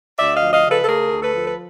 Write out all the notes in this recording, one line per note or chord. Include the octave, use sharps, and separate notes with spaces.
D2 D5 E5
D#5 F5
F3
D#5 F5
C#3
A4 B4
A4
A3 G#4 A#4
D2
A4 B4
F3
B4